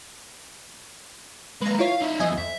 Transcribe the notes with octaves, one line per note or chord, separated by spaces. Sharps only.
G#3 A#3 B4 A#5
E4 F4 C#5 F5
D#4 E5
E2 F3 D#5 E5 G#5
F2 E5